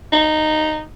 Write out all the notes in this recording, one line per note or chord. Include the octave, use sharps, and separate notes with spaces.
D#4